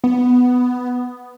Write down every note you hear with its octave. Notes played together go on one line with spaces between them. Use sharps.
B3